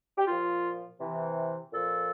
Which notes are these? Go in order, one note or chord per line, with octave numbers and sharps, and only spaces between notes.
G4
A#2 F3 F4
C3 E3
A#2 F3 A4